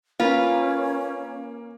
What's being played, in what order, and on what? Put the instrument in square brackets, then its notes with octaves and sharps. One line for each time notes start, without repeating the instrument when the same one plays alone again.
[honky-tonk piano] A#3 [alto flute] C#4 [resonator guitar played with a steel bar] F4 B4